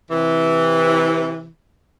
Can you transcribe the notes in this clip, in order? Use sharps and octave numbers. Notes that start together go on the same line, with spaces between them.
C3 E3